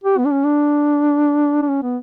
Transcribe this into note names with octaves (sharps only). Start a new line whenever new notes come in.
G4
B3
D4
C#4
D4
D4
C#4
B3